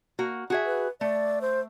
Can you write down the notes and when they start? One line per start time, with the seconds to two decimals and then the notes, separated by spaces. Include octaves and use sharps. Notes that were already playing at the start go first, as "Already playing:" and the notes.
0.19 A#3 F#4
0.50 F#4 G#4 E5
0.66 B4
1.01 A3 D5
1.41 C5